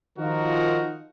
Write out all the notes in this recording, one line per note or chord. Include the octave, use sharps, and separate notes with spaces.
D#3 F3 D#4 F4 F#4 A#4